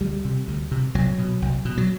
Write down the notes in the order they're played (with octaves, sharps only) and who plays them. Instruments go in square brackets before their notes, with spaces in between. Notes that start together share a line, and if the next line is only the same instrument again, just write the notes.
[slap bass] D2 G3
C3
D2
C3
C2 F#3
B2
C2
B2
F#3